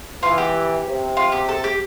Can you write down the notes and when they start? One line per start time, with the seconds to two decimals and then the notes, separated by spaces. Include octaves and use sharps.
0.23 E3 F4
0.38 G4
0.86 C3
1.17 F4
1.32 G4
1.49 A4
1.64 G4